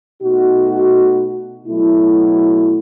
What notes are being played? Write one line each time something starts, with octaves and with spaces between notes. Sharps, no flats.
B2 A3 D#4 F#4
B2 F#3 A3 E4